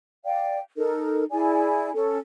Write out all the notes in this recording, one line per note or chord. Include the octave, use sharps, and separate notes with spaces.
D5 F5 G5
D#4 A4 A#4
E4 G#4 D5 G#5
C#4 A4